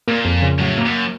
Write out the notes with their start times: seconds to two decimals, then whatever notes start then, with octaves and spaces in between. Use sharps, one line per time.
0.08 A#2 A#3
0.25 F2
0.42 C#3
0.59 A2 F#3
0.78 A#3
0.85 F#2